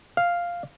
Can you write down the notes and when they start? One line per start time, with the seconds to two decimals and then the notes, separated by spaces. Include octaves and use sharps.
0.17 F5